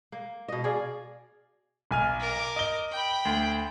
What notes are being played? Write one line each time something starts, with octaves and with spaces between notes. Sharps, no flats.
A#3
B2 D#5
G#4 D5 F5
B1 G#5 F6
A#4 D6
D#5 G7
G5 B5
D2